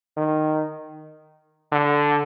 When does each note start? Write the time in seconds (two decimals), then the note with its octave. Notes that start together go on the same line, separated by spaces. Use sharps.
0.17 D#3
1.72 D3